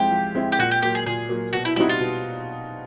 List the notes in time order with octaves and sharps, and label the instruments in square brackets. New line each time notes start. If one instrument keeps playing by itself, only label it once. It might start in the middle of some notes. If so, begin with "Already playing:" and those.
Already playing: [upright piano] F3 G#3 C4 E4 [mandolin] G4
[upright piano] F3
G#3 C4 E4
[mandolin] G4
[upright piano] A#2 [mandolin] F#4
[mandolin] G4
[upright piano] F#3 A#3 [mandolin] G4
[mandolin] G#4
[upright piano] A#2 [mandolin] G#4
[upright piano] F#3 A#3
[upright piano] B2 [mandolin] F#4
[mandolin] E4
[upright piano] G3 C4 D#4 F#4 [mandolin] E4
[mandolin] F4
[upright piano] B2